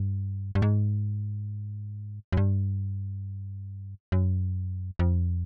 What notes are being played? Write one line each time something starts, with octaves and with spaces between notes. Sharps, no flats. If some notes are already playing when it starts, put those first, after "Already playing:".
Already playing: G2
G2
G#2
F#2
G2
F#2
F2